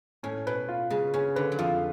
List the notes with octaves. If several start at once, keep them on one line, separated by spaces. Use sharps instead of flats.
A2 C#4
B2 B4
F4
C#3 G#3
C#3 C#4
D3 B4
F#3
F2 F3 F4